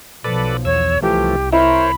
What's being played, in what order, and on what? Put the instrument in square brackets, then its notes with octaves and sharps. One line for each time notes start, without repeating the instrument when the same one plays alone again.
[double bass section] B1 F3 [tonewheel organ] A4 B4 D5
[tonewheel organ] E2 E6 [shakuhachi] C#5
[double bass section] C2 [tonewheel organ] E3 F3 A3 [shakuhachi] G4
[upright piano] E4 [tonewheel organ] A#4 C5 C#5 [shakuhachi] B5